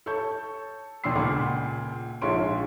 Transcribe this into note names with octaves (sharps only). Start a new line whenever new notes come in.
A4 C#5 A5 C#6 G6
D#2 B2 D4 C6 E6 C7
C#2 A#2 F#5 B5 C6
A#1 G#2 F4 C#5 C6 D7